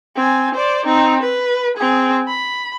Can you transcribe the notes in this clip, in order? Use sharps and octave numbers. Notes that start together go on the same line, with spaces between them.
C4 G#5
C5 D5
C4 D#4
B4
C4 G#4
B5